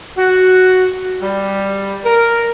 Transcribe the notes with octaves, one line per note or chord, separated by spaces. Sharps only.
F#4
G3
A#4